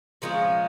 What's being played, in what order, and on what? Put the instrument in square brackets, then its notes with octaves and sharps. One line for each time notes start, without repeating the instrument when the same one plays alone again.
[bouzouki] A#2 F3 G#3 C#4